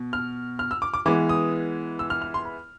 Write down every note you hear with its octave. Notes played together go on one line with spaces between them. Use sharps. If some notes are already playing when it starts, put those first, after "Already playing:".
Already playing: B2
F6
F6
E6
D6
D6
E3 G#3 B3 D6
D#6
E6
F6
F6
C6
B5